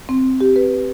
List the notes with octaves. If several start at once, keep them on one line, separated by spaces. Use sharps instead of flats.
C4
G4
B4